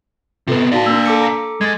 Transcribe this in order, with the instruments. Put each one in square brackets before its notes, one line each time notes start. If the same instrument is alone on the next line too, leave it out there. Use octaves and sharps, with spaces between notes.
[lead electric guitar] C3 B3 [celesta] F4 A4 B4
[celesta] D#4 F#4 A5 [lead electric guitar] D5 F5
[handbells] A#3 D4 [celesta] E6
[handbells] A4 D6 C#7
[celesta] A#5 A#6
[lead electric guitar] G#3 [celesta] G#6 A6